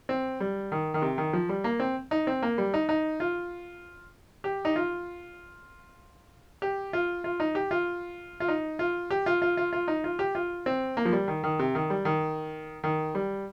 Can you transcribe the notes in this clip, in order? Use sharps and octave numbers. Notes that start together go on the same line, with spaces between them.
C4
G3
D#3
D#3
C3
D#3
F3
G3
A#3
C4
D#4
C4
A#3
G3
D#4
D#4
F4
G4
D#4
F4
G4
F4
F4
D#4
G4
F4
F4
D#4
F4
G4
F4
F4
F4
F4
D#4
F4
G4
F4
C4
A#3
F3
G3
D#3
D#3
C3
D#3
G3
D#3
D#3
G3